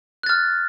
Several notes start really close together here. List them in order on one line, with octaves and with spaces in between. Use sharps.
F#6 A6 F6